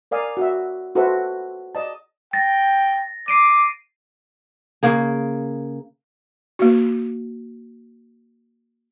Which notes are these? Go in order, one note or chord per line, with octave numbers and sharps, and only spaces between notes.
A#4 D5 F5 G#5 D#6
F#4 E5
F4 F#4 A4 B4 C5 E5
D5 D#5 A5
G5 A6 A#6
D6 C7 D7 D#7
C#3 A#3 G#4
A#3 F#4